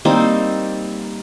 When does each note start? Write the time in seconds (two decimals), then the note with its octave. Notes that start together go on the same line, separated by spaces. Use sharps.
0.05 G3 A#3 C4 D#4